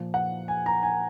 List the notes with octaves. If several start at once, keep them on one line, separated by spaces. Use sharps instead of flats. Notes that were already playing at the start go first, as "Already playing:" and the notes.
Already playing: A#2 F3
F#5
G#5
A#5
G#5